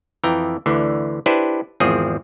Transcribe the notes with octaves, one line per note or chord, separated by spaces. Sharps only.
F2 E3 G5 A#5
D2 D3 E3
D4 E4 G4 B4 C5
G#1 E2 F3 C4 G#4